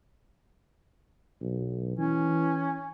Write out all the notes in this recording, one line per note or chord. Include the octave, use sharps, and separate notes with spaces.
B1
E3 C#4